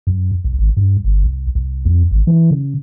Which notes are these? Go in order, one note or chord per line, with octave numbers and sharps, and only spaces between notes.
F#2
C2
G#1
G2
G1
C2
C2
F2
G#1
E3
C#3